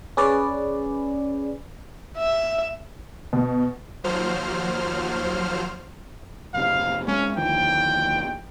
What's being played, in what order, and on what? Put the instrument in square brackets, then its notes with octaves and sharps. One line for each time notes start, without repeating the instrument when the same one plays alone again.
[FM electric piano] C#4 G#4 B4 D5
[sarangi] E5
[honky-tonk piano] B2
[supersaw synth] D#2 F3 F#3 C5 F6
[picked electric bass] F#1 C3 [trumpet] F5
[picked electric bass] G#3 C4 [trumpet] C#4
[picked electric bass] D2 D#3 F3 [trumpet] G5